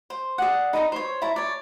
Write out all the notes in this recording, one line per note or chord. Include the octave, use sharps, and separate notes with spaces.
C5
G#4 D5 F#5
D#4 B4 D#5 A#5
C5 C#5
E4 A5 A#5
C#5 D5